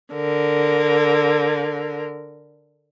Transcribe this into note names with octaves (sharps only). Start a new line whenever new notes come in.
D3 A#4